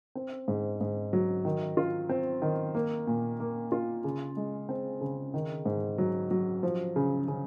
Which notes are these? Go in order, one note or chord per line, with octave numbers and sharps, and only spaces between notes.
C4
G#2
G#2
F#3
D#3
F4
C4
D#3
A#3
A#2
A#3
F4
C#3
G#3
C4
C#3
D#3
G#2
F#3
F#3
F3
C#3
C#3